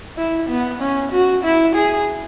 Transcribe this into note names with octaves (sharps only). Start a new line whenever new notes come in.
E4
B3
C#4
F#4
E4
G#4